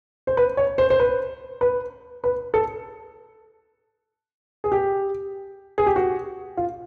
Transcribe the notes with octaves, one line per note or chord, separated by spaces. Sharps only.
C5
B4
C#5
C5
C5
B4
B4
B4
A4
G#4
G4
G#4
G4
F#4
F4